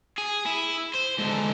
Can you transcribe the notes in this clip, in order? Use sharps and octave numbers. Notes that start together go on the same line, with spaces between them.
G#4
E4
C5
G#2 D3